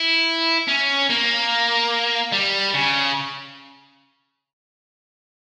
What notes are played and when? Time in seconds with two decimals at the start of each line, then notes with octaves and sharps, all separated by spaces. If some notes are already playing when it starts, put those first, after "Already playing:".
Already playing: E4
0.68 C#4
1.10 A#3
2.32 G3
2.74 C#3